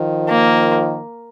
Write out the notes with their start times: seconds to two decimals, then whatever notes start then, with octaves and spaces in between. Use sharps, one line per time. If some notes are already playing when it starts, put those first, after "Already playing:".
Already playing: D#3 F3
0.29 A#3